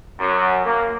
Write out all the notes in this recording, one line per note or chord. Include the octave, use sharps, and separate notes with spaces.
F#2
A#3